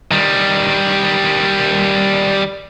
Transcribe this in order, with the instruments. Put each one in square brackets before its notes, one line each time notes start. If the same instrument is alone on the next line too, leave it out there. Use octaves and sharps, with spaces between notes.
[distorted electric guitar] D#3 G3